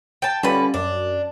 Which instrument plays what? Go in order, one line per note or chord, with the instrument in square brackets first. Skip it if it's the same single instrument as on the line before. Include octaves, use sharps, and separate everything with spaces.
[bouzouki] G5 A5
[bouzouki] D3 B4 [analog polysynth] G3 C#4 F4
[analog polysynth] F#2 [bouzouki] D4